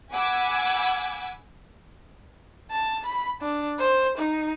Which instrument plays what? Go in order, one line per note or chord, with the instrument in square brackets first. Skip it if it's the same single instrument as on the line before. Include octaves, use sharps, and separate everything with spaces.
[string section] F#5 G#5 B5 D6 E6 G#6
[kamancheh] A5
B5
D4
C5
D#4